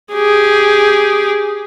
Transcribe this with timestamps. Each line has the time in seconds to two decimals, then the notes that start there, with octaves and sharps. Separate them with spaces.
0.13 G4 G#4